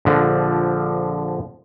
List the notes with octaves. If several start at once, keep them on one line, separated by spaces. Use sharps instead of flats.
A#1 D3 F3